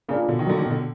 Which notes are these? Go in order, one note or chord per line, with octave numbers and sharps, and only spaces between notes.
C#3 A#3 D4 F4
B2 D3
D#3
D3 F#3 A#3
D#3
B2 D3